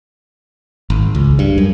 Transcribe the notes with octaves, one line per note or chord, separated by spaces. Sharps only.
G#1
C#2
G2
F#2